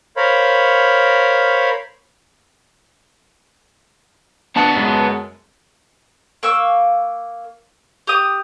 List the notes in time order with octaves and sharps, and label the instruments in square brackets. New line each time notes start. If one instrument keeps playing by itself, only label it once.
[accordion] A#4 C5 C#5 F5 B5
[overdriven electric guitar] B3 A5 [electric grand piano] D4 F#5
[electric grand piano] F#2 G#3
[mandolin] A#3 C#6 E6
G4 D#6